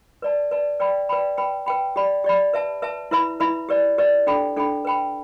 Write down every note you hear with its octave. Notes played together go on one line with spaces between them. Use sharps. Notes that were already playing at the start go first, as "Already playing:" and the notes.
B4 D5 A5
B4 D5 A5
B4 D5 G5 B5
B4 D5 G5 B5
B4 G5 B5
B4 G5 B5
G4 D5 B5
G4 D5 B5
B4 E5 A5
B4 E5 A5
E4 B4 E5 B5
E4 B4 E5 B5
G4 B4 D5
G4 B4 D5
D4 A4 G5 B5
D4 A4 G5 B5
B4 G5 B5